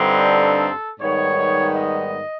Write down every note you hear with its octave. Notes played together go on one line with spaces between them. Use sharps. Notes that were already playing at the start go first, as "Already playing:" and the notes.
Already playing: G2 D3 G3 C4 D#4
A4
G#2 D#3 G3 B3 C#5
D#5